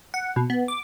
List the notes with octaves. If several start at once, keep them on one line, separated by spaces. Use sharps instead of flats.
F#5
B2
B3
D6